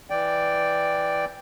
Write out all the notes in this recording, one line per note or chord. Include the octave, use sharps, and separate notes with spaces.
E3 D5 G5